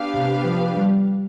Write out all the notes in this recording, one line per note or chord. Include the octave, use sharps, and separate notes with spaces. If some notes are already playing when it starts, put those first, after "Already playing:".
Already playing: B3 D4 G4 B4 F5
C3
F3
G3